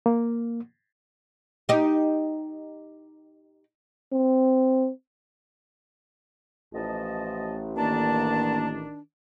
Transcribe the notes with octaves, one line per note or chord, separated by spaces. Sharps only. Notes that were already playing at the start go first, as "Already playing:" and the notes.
A#3
D#4 G4
C4
A1 F3 D#5 A5
D#3 A#3 D4 D5 A5 A#5